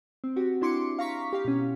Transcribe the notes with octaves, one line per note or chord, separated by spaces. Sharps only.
C4
C4 F#4 G4
D4 E4 C6 D6 C#7
F5 A#5 C#6 B6
G4 F5
B2 C#4